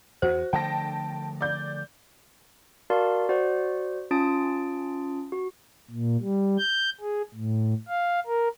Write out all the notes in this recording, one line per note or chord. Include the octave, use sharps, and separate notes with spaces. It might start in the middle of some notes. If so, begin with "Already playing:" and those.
E2 F#4 C5
D3 F3 A3 G5 A5 A#6
D5 G6
F#4 A#4 D5 F5 A5 C6
F#4 C5 D5 F#5
C#4 F4 A5 D#6 A6 D7
F#4
A#2
G3
G6
G#4
A2
F5
A#4